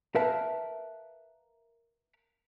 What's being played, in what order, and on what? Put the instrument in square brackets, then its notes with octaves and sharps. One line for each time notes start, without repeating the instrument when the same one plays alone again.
[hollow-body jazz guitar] A#4 B4 E5 F5 A5